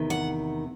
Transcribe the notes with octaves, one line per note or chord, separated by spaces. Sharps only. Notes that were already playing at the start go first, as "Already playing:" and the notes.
Already playing: E2 C3 D#3 B3
F#5